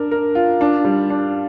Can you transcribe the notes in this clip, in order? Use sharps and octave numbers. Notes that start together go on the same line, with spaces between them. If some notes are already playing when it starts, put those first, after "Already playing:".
Already playing: D4 A#4
A#4
F4
D4
G3
D4